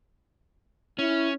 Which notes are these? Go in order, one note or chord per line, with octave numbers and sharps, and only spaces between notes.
C#4 E4